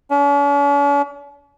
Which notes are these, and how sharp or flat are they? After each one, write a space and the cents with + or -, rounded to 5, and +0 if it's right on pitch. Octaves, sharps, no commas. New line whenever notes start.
C#4 +45